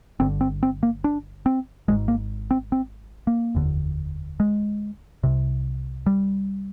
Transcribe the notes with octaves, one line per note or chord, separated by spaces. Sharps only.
G1 G2 D3 C4
C4
C4
A#3
D4
C4
G#1 G#2 G#3
A#3
C4
C4
A#3
F1 D#2 D3
G#3
C2 C3
G3